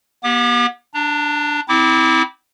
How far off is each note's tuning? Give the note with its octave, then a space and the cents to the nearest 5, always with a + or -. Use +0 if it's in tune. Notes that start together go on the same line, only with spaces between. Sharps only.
B3 -45 G4 +0 D6 +40
D4 +0 A#5 -45
C4 -25 E4 -25 D6 +0